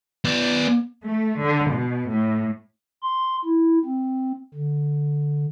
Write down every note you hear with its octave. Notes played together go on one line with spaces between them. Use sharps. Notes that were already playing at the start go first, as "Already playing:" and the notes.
B3 D5
A3
D3
B2
A2
C6
E4
C4
D3